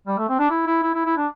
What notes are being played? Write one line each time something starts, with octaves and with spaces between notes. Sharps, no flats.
G3
A3
C4
D4
E4
E4
E4
E4
E4
D4